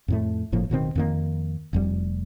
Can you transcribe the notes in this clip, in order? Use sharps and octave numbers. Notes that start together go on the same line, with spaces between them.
F2 A2 A3
G1 A2 F3 A#3
D1 B2 D#3 C4
F2 D#3 A#3
F1 F2 G3